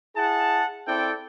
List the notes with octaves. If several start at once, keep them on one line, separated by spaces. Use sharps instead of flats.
E4 G#4 F#5 A5
C4 E4 A4 D5 G5